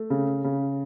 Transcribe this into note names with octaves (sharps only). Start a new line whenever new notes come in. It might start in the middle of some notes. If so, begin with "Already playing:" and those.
Already playing: A3
C#3
C#3